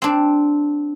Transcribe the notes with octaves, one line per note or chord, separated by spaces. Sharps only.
C4 D4